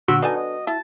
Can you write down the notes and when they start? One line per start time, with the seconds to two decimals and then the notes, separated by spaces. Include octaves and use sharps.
0.08 A#2 D3 F#4 E6
0.22 D4 D#4 A4 B4 G#5
0.35 D#5
0.67 E4 A5